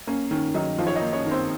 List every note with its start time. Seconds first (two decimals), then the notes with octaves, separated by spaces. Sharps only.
0.07 A#3 C#4
0.31 D#3 C#4
0.54 D#3 F#3 D#4
0.78 D#3 F3 F4
0.87 C#5
0.95 D#4 D#5
1.02 A#3
1.13 C#4 C#5
1.25 D#3
1.31 C4 C5